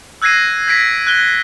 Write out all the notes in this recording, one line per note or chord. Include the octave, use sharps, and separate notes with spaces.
E6 F#6 G#6 A#6 C7 D#7
G#6 A#6 B6 D7
F#6 G7